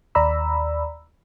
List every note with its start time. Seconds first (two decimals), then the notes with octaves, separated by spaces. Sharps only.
0.15 D#2 D5 A#5 B5 E6